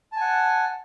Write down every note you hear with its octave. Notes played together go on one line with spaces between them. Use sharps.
F#5 G#5 A5